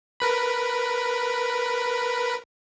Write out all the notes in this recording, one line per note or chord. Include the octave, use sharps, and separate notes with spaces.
A#4 B4 B5